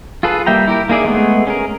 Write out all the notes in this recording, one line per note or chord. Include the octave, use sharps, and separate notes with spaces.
F4 G#4 A4 B4
G3 A#3 E5 G5 A#5
E4 G4 A#4
A#3 D#4 G#4 D5 E5
G#3 A3 B3 G#4
C#4 G#4 A#4